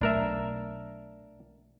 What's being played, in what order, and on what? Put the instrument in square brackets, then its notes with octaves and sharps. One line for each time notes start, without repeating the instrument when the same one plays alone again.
[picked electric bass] B1 A3 [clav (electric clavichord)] D4 A#4 E5